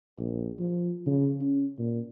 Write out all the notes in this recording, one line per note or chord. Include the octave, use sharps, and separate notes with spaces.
A#1
F3
C#3
C#4
A#2